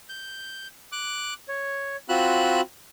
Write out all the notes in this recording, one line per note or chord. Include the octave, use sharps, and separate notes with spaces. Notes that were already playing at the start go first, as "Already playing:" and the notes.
G6
D6 F#6
C#5
C4 F4 F#4 B5 E6 F#6